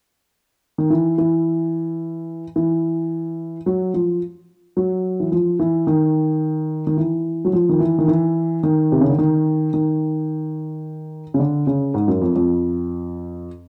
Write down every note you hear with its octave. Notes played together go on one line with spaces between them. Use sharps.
D#3
E3
E3
E3
F#3
F3
F#3
E3
F3
E3
D#3
D#3
E3
F#3
F3
D#3
E3
D#3
E3
D#3
C3
C#3
D3
D#3
D#3
C#3
D3
C#3
G#2
F#2
F2
F2